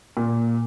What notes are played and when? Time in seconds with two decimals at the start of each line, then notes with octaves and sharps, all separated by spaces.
0.17 A#2